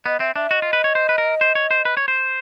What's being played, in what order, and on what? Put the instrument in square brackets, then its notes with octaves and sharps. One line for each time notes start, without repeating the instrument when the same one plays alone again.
[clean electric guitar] B3 [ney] D#5
[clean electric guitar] C4 [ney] E5
[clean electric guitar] D4 [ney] E5
[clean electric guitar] F#4 [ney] D#5
[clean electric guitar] F4
B4
C#5
C5
B4
A#4
C5
C#5
C5
B4
C#5
C5